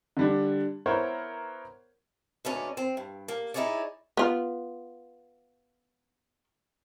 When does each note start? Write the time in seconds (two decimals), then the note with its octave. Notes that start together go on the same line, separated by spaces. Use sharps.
0.17 D3 G3 D4
0.86 B3 E4 A#4 C5 C#5 F#5
2.45 D2 G#2 D#3 B3 C#4 D5
2.77 C4
2.97 G2
3.28 A#3
3.54 D#4 E4 G4 G#4 C#5 D5
4.17 B3 F4